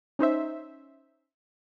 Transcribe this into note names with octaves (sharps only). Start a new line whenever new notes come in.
C#4 D#4 C5 E5